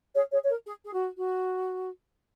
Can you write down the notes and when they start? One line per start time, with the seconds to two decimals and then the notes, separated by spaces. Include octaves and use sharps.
0.14 G#4 C#5
0.31 G#4 C#5
0.43 C#5
0.49 A#4
0.65 G#4
0.83 G#4
0.93 F#4
1.15 F#4